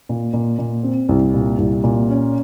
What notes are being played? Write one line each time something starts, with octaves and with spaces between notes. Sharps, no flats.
A#2
A#2
A#2
C4
C2
A#2
C2
A#2
C#4